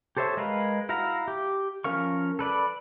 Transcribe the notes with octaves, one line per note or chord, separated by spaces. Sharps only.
G4 A4 C5 C#5 E5
G#3 A#4 B4 F5
E4 F#4 E5 F5 A#5
G4
F3 C#4 A#4 F5 C#6
A4 B4 D5 B5